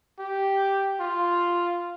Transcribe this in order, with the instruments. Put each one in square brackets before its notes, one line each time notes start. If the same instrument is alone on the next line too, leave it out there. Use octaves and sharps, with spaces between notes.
[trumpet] G4
F4